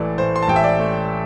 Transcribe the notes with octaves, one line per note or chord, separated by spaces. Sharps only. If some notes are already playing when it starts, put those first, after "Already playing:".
Already playing: A1 E3 A3 D5
A2 C5
C6
A5
A1 G5
E5
D5
A3